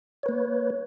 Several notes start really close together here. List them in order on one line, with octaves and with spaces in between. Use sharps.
C#5 B4 A#3